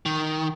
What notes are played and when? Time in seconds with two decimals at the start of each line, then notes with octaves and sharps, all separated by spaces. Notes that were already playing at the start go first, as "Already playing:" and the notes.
0.06 D#3